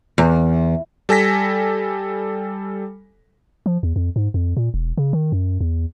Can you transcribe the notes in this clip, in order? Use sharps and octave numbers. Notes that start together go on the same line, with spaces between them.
E2
G3 A4 G#5 A#6 B6
F3
E2
F2
G#2
F2
A#2
E1
C#3
D#3
F#2
E2